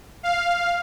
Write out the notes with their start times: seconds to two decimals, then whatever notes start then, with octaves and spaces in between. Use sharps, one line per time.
0.23 F5